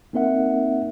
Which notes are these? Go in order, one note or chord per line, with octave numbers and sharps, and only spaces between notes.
A#3 C4 D#4 A#4 E5 F#5